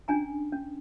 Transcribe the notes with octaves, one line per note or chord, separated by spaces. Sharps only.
C#4 D4 G#5 A#5
C#4